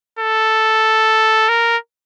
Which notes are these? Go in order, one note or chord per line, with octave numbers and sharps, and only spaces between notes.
A4
A#4